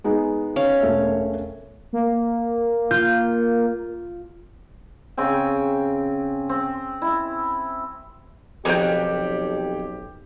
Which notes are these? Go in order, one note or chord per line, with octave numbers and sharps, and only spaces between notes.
G#3 B3 D#4
C#4 C#5 F5
E1 A3 E5
A#3
F4 G6
C#3 C4 G5 G#5
C4
E4
B1 F2 C#3 F#3 G4 G5